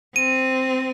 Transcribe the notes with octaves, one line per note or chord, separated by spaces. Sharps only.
C4 D#7